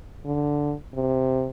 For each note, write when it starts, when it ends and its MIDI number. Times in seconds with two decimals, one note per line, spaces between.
0.25 0.74 50
0.94 1.48 48